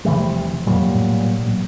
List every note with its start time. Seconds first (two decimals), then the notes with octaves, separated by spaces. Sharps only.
0.05 E1 C3 E3 F3 G3 A3
0.66 F2 A#2 F#3 G3
0.91 B1 A2
1.43 A1 A#2 F#3